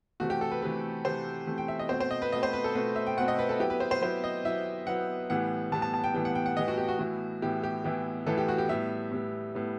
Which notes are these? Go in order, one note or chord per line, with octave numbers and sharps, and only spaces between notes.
C3 E3 A3 F#4
G4
A4
B4
C3 E3 A3 B4
C3 E3 A3 C5
C3 E3 A3
G5
E5
D#5
B2 A3 C4 C5
C5
D#5
B4
B2 A3 C4 D#5
C5
B4
A4
B2 A3 C4 B4
E5
G5
B2 A3 C4 F#5
D#5
B4
A4
F#3 B3 E4 G4
B4
C5
C5
F#3 B3 E4 C5
D#5
F#3 B3 E4 E5
F#3 B3 E4 F#5
A2 E3 G3 B3 F#5
A2 E3 G3 B3 A5
A5
A5
G5
A2 E3 G3 B3 G5
F#5
G5
F#5
A2 E3 G3 B3 D#5
F#4
G4
F#4
A2 E3 B3 E4 F#4
A2 E3 B3 E4 G4
G4
A2 E3 B3 E4 G4
A2 E3 B3 E4 A4
G4
F#4
G4
A2 G3 B3 E5
A2 G3 B3
A2 G3 B3